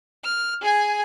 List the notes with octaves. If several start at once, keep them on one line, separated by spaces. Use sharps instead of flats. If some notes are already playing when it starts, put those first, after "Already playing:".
F6
G#4 G#5